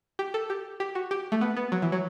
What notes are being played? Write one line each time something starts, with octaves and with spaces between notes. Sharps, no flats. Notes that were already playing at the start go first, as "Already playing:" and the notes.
G4
A4
G4
G4
F#4
G4
A3
B3
B3
F#3
E3
F#3